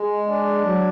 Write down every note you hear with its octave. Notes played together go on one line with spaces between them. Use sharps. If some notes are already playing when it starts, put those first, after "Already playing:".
Already playing: G#3
D4
F#3